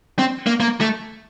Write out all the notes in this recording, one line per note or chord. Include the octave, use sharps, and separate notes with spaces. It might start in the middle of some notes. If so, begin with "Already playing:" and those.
C4
A#3
A#3
A3